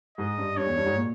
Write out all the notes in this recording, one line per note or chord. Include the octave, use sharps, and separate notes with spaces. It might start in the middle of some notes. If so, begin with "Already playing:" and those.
G#2 D#5
G2
G2 C#5
E2
G2
G#2
A#2